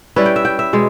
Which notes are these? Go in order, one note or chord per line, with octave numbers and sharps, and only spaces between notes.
G3 C#4 E4 B4
G5
E5
G5
E5
B2 G#3